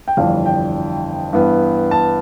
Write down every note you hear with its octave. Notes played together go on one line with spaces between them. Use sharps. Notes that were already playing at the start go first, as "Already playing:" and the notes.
G5
G1 F2 E3 G3 D4 F5
G5
G2 E3 B3
A5